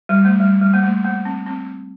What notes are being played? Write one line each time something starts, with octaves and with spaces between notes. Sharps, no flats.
G3
A3
G3
G3
A#3
A3
A#3
C4
C4